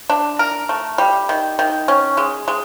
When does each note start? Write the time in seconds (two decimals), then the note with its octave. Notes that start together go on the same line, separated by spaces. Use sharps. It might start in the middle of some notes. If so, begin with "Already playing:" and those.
0.09 D4
0.39 A#4
0.69 A3
0.98 G3
1.29 D#3
1.59 D#3
1.88 C#4
2.17 G#3
2.48 G#3